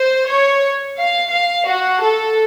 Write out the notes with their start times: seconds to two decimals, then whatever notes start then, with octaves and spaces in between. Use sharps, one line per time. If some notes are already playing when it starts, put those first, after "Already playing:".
Already playing: C5
0.27 C#5
0.97 F5
1.32 F5
1.67 F#4
2.02 A4